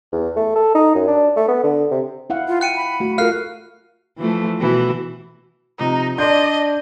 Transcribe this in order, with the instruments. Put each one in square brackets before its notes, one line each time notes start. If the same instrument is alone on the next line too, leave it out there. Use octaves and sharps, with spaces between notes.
[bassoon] E2
A3
A4
D#4
F#2
D4
A3
B3
D3
C3
[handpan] E4 F5 F#5
[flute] F4
[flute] G5 [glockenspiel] F#6 C#7 D#7
[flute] B5
[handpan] A3 F#4
[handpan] F4 A4 F5 [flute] A#4 [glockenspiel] F6 F#6 C7
[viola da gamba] E3 F3 A3
B2 E3 F#4
[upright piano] C3 F3 [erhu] D#4
[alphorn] D4 [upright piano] D5 C6 G6 [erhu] D#5